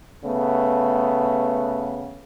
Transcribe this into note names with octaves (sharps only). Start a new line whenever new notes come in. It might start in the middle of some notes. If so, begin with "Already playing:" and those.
C#3 A3 B3